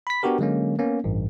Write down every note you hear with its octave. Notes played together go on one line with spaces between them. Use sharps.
B5 B6
B3 D4 F#4 G4 A#4
D3 F#3 G#3 A#3 C#4
A#3 B3 C#4
A1 G2